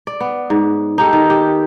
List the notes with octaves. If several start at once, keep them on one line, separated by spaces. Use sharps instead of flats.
D5
B3
G#2
D#4 G4 A4
D#3
G4